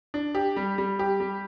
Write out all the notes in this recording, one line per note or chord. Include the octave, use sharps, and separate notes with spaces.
D4
G4
G3
G3
G4
G3